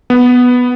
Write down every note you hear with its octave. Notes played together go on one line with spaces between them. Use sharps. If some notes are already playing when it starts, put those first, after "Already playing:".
B3